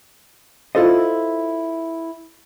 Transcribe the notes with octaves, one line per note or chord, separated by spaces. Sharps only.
E4 F4 A4 C5 D#5